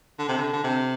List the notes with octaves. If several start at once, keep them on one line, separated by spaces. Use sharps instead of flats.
D3
C3
D3
D3
C3